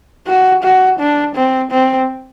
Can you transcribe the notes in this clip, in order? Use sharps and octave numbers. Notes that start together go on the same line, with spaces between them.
F#4
F#4
D4
C4
C4